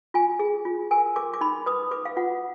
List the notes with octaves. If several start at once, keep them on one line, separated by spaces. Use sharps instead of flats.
F4 G#5
G#4
F4
A#4 G#5
A#4 D6
D6
D#4 B5
B4 D#6
B4 D6
F5
F4 F#5